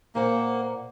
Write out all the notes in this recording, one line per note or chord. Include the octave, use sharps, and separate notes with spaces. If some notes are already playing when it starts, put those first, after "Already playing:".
A#2 A#3 C5 F#5